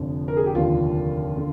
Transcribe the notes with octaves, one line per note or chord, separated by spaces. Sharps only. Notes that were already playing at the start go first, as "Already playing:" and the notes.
Already playing: F1 F2 D3
A#4
G#4
G4
F1 D#2 D3 F4
D3